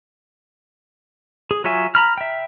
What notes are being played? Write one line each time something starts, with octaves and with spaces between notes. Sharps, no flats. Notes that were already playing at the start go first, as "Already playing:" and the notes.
G#4
F#3 F4 C#5 E5 G#5
A#5 B5 F6
E5 G5